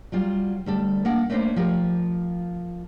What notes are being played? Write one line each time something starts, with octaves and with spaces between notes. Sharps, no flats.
F#3 G3 F4
D2 G3 A4
A#3 D4 F#5
A3 A#3 C#4 D4 A#4 C5
F3 G4 A#4